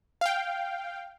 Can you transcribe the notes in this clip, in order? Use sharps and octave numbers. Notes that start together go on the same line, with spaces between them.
F5 G5